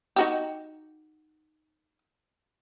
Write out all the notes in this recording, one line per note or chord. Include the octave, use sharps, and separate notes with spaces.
D#4 F#4 G4